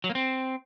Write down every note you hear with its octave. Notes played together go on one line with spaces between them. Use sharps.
F#3
A#3
C4